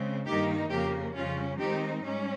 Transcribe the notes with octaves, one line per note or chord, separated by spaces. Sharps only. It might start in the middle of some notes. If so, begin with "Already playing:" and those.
Already playing: C#3 G#3 C4
G2 D#3 A#3 D#4 G4
F2 C#3 F3 A#3 G4
F2 C#3 G3 C#4 F4
D#3 G#3 C4 D#4 G4
G#2 G3 C#4